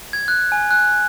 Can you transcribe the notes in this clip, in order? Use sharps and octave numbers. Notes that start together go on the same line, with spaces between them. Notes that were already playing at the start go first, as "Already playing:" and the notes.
G#6
F#6
G#5
F#6